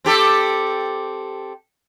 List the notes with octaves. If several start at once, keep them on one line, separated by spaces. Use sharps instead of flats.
C4 G4 A4